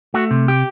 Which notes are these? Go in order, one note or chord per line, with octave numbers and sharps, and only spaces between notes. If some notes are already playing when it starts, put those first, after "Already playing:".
A3 F#4
C3
G4